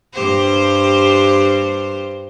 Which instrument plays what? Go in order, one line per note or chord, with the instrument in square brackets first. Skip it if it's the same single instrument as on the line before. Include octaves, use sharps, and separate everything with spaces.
[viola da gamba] G2 G4 C5